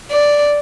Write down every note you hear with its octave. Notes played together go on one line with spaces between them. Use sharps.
D5